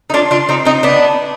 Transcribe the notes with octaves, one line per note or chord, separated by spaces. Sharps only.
D#4
D4 F4
D4 F4
C4 D#4
C4 D#4
B3 D4